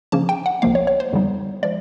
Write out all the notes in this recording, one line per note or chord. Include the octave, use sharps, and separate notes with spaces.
C#3 F3 A#3 C#4 A5
G5
F#5
C2 C3 F3 A#3 F5
C#5
C#5
C5
F2 D3 G3 B3 D#4
F3 G#3 D5